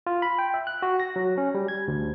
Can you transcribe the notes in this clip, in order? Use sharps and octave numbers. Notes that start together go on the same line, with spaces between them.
F4
B5
G5
E5
F#6
F#4
A#6
F#3
C#4
G3
G#6
D2